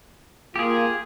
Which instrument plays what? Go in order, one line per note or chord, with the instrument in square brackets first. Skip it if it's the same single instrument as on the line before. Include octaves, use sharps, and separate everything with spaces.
[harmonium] A#3 F4 [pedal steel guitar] G4 G#4